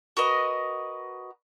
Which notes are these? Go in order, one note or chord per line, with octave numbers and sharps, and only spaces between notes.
F#4 A#4 B4 D#5